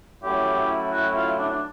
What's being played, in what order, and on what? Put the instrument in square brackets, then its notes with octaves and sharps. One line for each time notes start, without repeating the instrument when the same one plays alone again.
[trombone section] A2 F#3 A3 C#4 E4 [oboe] G4
[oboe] F#4
F4
D4
D4